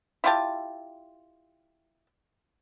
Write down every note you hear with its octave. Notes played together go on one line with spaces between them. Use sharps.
E4 F4 G4 A5